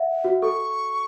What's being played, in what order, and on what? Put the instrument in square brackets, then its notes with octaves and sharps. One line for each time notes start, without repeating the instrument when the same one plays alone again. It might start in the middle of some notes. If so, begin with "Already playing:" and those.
Already playing: [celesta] E5 F#5
F#4
[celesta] A4 [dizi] C#6